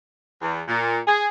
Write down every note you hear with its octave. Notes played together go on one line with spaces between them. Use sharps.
E2
A#2
G#4